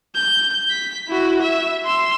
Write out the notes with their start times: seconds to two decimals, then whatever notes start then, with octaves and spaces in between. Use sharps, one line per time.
0.15 G6
0.70 B6
1.08 E4 F#4
1.41 E5
1.85 C6 E6